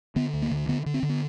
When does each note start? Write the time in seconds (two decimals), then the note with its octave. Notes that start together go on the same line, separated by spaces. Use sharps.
0.16 D3 B3
0.34 D2
0.42 A#3
0.51 D3
0.68 D3 B3
0.86 D3
0.94 C4
1.03 D3
1.09 B3